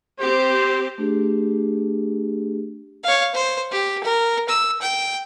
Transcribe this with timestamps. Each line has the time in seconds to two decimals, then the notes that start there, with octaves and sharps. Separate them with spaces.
0.20 C4 G4 C5
0.98 A3 D4 G4 G#4
3.04 C#5 F5
3.35 C5
3.71 G4
4.03 A#4
4.49 E6
4.81 G5